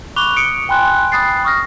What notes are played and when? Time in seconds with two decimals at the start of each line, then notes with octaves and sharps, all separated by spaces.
0.16 B5 C#6 D6 F#6 F7 G7
0.36 D#6 C#7 D7
0.69 G5 G#5 B5 C6 F#6
1.12 G5 B5 D#6 F#6 A6 C7
1.44 C#6 D#6 F6 A#6